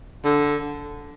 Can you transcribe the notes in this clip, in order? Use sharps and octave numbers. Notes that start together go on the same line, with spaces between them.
D3